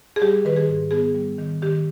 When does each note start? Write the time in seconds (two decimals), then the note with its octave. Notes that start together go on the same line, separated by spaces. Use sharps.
0.16 G#4
0.22 G3 G4
0.45 D#3 B4
0.56 G#4
0.68 G#2
0.91 B3 G#4
1.14 G3
1.38 D#3
1.62 D#3 G4